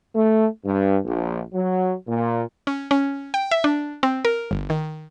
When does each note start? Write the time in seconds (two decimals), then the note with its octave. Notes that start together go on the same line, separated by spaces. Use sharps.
0.15 A3
0.65 G2
1.06 A#1
1.54 F#3
2.07 A#2
2.67 C#4
2.91 C#4
3.34 G5
3.51 E5
3.64 D4
4.03 C4
4.25 A#4
4.51 G1
4.70 D#3